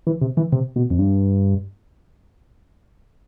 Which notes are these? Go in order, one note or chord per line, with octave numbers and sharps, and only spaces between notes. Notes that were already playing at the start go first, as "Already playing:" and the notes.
E3
C3
E3
C3
B2
F2
G2